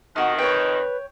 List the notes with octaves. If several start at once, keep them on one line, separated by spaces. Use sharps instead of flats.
F2 D#3 D#4 F#4
B4 C#5 G5